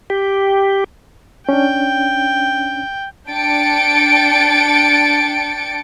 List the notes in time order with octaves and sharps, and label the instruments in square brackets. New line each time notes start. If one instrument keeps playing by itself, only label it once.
[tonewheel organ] G4
[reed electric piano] C#4 D4 [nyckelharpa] G5
[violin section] D4 G5 A6 C#7 D7